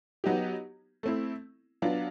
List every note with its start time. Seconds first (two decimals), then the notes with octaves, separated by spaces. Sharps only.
0.24 F#3 B3 D#4 G4
1.03 A3 C4 E4
1.82 F#3 B3 D4 F4